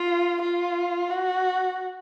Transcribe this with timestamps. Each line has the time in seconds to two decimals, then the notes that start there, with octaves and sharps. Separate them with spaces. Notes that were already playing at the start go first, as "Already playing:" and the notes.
Already playing: F4
0.42 F4
1.10 F#4